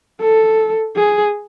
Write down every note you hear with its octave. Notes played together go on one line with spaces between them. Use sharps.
A4
G#4